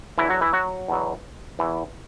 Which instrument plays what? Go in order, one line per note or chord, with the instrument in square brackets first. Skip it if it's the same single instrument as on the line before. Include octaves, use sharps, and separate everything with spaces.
[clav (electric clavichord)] E2 D3 E3 F#3 E4
F#3 F#4
E3 E4
F#3 F#4
E2 B2 F#3
E2 E3